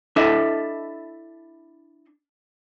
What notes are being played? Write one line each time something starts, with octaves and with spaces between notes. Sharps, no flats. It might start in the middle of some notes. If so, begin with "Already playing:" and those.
D4 E4 A4 D#5 E5